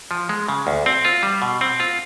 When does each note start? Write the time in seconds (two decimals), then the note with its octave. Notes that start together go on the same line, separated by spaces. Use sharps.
0.11 F3
0.29 G#3
0.48 C#3
0.67 D2
0.86 C4
1.05 F4
1.23 G3
1.42 B2
1.61 C4
1.80 F4